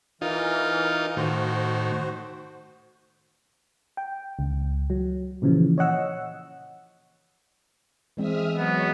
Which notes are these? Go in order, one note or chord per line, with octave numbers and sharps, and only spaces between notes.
E3 D#4 F4 A#4
A2 D#3 F#4 C5
G5
C#2
F#3
A#2 C#3 E3 F3
C#5 D#5 F#5 E6
E3 G#3 C4 E5 D#6 F6
F#3 B3 C#5 D#5